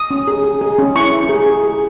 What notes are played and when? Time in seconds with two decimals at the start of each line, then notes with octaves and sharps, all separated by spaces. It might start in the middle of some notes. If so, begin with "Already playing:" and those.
Already playing: D#6
0.11 C#4
0.28 G#4
0.44 G#4
0.61 G#4
0.78 C#4
0.95 E4 C#6
1.12 E4
1.29 G#4
1.46 G#4
1.64 G#4